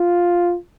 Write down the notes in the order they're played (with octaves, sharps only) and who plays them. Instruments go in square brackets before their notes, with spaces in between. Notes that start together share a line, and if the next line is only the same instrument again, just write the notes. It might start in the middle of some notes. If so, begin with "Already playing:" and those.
Already playing: [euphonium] F4